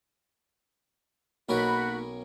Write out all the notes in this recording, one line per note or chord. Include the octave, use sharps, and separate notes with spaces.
B1 A#3 C#4 D#4 F#4 A#4 B5